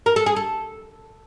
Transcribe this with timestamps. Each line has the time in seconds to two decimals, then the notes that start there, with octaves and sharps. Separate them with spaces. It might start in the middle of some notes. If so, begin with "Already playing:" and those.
0.06 A#4
0.16 A4
0.26 G#4
0.36 A4